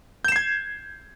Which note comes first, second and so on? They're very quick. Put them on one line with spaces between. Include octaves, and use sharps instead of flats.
G6 E7 C7 G#6